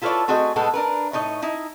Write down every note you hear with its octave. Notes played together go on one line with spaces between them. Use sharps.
E4 F4 A4 B4 C#5 D5
A3 C4 F#4 G#4 D5 D#5
A2 G#3 B3 A4
D4 A#4 B4
A2 D#4 C#5 D#5
D#4 E4